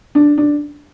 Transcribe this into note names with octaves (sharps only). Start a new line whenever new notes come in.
D4
D4